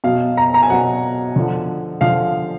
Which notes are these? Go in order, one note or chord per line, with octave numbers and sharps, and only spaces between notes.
B2 F#3 F5
A#5
A#5
G#5
B2 F#3 F#5
D3 F3
D3 F3 F5